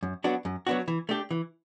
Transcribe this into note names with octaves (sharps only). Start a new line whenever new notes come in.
F#2
F#3 B3 D4 F#4
F#2
F#3 B3 D4 F#4
E3
A3 D4 G4
E3